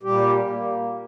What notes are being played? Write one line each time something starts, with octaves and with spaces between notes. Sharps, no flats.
A#2 G3 G4
A#3